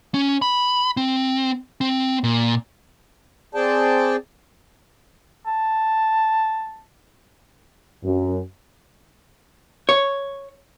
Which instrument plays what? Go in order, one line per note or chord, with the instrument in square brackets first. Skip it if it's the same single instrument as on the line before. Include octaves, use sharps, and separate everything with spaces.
[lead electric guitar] C#4
B5
C4
C4
A#2
[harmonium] C4 G#4 D5 G5 A5
[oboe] A5
[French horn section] F#2
[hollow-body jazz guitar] C#5